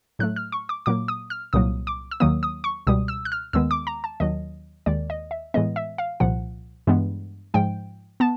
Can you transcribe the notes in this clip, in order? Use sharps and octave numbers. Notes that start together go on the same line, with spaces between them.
A2 F#3 A3 F#6
F6
C#6
D6
A#2 F#3 A#3 D6
D#6
F6
C2 A#2 F#3 A#3 D#6
D6
E6
D#2 D#3 F#3 A#3 D#6
D#6
C#6
C#2 B2 G3 D#6
E6
F#6
F6
D#2 D#3 G#3 B3 E6
D6
A#5
A5
D#2 D#3 F#3 D#5
D#2 D#3 G#3 D5
D#5
E5
A2 E3 G#3 B3 D#5
E5
F5
C2 A#2 F3 F#5
G2 E3 G#3 B3
G#2 F3 G#3 G5
B3 A5